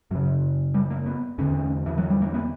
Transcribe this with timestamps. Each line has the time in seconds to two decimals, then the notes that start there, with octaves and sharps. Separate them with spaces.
0.11 F#2 C#3 F#3
0.74 G3
0.90 A#3
1.06 B3
1.38 E2 D3 C#4
1.86 E3
1.98 F#3
2.10 G3
2.22 A#3
2.34 B3